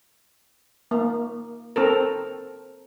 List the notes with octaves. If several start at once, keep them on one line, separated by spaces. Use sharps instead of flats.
A#3
C4 A4 A#4